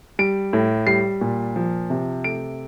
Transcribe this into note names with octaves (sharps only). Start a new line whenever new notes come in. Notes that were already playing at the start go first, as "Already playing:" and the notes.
G3 D7
A2
G3 C7
A#2
F3
C3
A3 D7